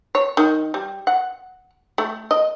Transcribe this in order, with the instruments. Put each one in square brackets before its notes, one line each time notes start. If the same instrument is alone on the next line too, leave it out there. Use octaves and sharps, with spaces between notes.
[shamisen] C#5
D#3
G3
F#5
A3
D#5